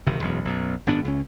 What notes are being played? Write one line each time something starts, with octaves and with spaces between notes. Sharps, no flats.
F#1 C3 D#3
E1 B1 F#2
B1 F#2
G#1 F#2 B3 D4
C#2 C#4